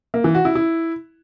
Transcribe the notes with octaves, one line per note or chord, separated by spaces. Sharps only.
A#3
E3
F#4
E4
E4